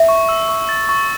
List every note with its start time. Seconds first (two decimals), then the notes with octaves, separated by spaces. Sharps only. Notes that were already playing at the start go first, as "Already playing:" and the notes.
Already playing: E5
0.09 C#6
0.29 E6
0.49 C#6
0.69 A6
0.89 C#6